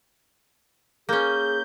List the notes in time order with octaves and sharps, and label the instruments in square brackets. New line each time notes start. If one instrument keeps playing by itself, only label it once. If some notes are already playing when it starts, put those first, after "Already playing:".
[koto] A#3 C#4 [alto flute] G#4 [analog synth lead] G6